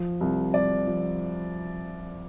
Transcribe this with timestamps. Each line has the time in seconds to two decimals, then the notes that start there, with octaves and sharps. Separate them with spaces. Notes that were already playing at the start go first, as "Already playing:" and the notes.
Already playing: F3
0.21 C2
0.54 C2 D5
0.87 F3